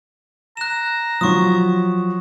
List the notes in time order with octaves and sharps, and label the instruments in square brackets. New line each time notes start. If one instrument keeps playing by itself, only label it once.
[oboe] A#5 [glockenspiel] F#6 E7
[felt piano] F3 F#3 [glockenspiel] C#6 D#6